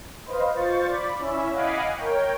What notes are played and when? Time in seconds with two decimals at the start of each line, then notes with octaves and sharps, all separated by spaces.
0.24 B4 C5 D#5 F5
0.55 F4 C5 C#6 A6
0.86 D5 B5
1.19 C#4 E4 E5
1.52 D#5 F5 F#5 G#5 B5 D6
1.96 A#4 C#5 G5